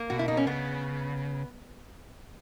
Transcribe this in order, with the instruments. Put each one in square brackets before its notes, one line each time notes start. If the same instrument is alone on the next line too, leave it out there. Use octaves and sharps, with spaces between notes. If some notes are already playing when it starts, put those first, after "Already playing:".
Already playing: [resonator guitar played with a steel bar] A#3
[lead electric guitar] B2 [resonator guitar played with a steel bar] F#4
[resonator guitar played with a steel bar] E4
[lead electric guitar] B2 [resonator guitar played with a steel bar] D#4
[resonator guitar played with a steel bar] C#4
[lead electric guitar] C#3 [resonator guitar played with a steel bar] B3